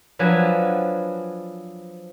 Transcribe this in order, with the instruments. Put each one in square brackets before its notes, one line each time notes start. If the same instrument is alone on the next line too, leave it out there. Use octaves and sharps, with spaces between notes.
[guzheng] F3 F#3 D4 B4 G#5